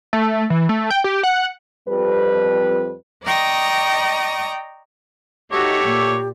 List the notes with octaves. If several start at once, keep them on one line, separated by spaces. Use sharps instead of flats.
A3
E3
A3
G5
G4
F#5
F2 G3 B4
D5 D#5 G5 A#5 C#6 D#6
A3 D#4 F#4 G4 C#5 D6
A#2